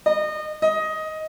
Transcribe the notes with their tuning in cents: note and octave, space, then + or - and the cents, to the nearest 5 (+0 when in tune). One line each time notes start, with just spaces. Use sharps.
D#5 -30
D#5 +10